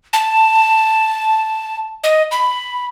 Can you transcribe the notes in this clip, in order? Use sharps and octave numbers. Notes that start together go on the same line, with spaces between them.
A5
D#5
B5